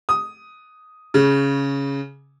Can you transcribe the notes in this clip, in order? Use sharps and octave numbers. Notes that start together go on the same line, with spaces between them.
D#6
C#3